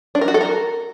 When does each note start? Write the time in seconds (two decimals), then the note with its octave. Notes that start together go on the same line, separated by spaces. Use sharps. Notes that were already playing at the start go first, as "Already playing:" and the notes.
0.15 D4
0.21 A#4
0.28 F#4
0.34 A4
0.41 A#4